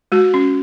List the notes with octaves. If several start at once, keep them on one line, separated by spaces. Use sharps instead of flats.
G#3 F#4
C#4